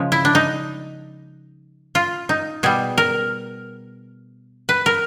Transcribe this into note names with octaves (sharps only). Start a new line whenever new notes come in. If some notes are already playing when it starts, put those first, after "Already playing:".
Already playing: C#3 F3 G#3
E4
D4
D#4
F4
D#4
B2 G3 G#4
A#4
B4
A#4